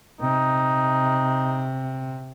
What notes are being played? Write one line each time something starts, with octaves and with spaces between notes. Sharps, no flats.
C3 D#4